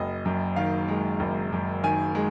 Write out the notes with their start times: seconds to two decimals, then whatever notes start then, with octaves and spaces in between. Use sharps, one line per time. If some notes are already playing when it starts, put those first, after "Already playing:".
Already playing: F#1 D#5
0.25 F#2
0.56 D#3 F5
0.88 G#3
1.20 F#1
1.52 F#2
1.83 D#3 G#5
2.15 G#3